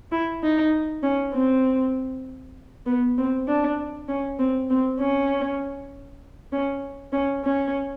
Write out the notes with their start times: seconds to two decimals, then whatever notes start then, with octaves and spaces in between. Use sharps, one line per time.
0.12 E4
0.43 D#4
1.03 C#4
1.34 C4
2.86 B3
3.18 C4
3.48 D4
4.09 C#4
4.39 C4
4.70 C4
5.00 C#4
6.53 C#4
7.13 C#4
7.44 C#4